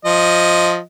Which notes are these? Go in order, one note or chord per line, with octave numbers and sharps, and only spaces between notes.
F3 D#5